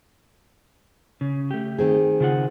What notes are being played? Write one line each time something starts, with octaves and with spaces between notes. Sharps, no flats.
C#3
A3 G4
D#3 C4 G#4
C#3 F4 F#5